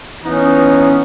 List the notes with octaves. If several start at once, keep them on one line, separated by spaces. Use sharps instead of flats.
E3 B3 C#4 D#4